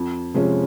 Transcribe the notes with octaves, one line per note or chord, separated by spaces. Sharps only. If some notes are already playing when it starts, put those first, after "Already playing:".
Already playing: F2
C3 F3 G#3 C#4